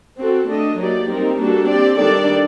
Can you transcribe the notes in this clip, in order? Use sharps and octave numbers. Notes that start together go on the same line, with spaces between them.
C4 F#4 A4
A3 D4 A4 D#5
F#3 A#3 D#4 G4 D5
G3 C4 D#4 G4 A#4
G3 A#3 D4 F#4 A4
C4 G4 D5
D#3 G3 D4 A4 D5